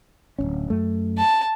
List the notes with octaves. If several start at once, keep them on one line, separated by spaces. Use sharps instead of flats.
D1 G#1 C#4
F#2 A3
A5